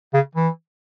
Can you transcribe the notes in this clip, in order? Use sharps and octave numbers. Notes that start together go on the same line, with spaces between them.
C#3
E3